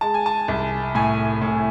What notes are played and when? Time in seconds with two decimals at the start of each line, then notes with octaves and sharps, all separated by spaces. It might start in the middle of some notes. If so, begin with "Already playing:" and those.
0.01 G#3 A5
0.14 G#5
0.26 A5
0.48 C2
0.95 A2 G#5
1.41 A2